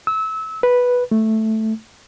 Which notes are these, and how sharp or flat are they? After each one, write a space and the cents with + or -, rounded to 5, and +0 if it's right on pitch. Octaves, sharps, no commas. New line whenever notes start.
E6 -25
B4 -5
A3 +0